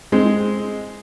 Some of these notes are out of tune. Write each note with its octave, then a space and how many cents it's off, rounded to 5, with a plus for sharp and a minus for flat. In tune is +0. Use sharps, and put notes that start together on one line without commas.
G#3 +0 C4 +0